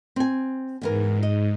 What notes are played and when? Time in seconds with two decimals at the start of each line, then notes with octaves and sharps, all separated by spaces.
0.16 C4 G#5
0.81 E2 G#2 E3 A#4
1.23 D#5